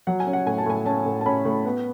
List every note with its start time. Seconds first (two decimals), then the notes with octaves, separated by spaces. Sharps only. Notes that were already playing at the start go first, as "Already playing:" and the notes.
0.07 F#3 F#5
0.20 G#5
0.27 C#4
0.33 F#5
0.46 A2 G#5
0.58 A5
0.66 A2 G#5
0.85 C#4 A5
1.06 A2
1.21 A5
1.26 C#4 B5
1.45 A2
1.65 B3